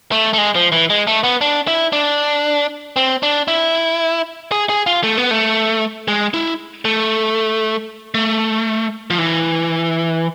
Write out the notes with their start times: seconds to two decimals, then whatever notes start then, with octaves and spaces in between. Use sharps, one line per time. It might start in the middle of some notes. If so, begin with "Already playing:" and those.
0.12 A3
0.33 A3
0.38 G#3
0.55 F3
0.72 E3
0.90 G#3
1.07 A3
1.24 B3
1.41 D4
1.67 E4
1.93 D4
2.96 C4
3.23 D4
3.48 E4
4.52 G#4
4.69 G#4
4.87 F4
5.04 A3
5.17 B3
5.31 A3
6.08 G#3
6.34 E4
6.85 A3
8.14 A3
9.10 F3
9.18 E3